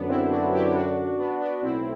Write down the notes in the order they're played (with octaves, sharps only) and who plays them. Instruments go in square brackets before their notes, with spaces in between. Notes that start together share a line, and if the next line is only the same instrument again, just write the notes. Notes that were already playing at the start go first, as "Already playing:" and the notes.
Already playing: [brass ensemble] F#2 D3 F#3 [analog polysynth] B3 D4
[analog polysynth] C4 E4
D4 F#4
E4 G4
G4
D4 F#4
B3 D4
B3 D4
[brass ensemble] B1 A2 [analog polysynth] C4 E4